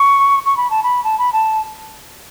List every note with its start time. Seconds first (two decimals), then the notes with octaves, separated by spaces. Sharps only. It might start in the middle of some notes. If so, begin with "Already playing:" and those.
Already playing: C#6
0.46 C#6
0.57 B5
0.71 A5
0.83 B5
1.04 A5
1.19 B5
1.33 A5